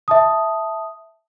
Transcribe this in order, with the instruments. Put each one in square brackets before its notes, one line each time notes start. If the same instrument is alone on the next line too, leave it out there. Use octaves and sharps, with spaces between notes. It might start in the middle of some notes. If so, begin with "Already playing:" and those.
[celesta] E5 A5 D#6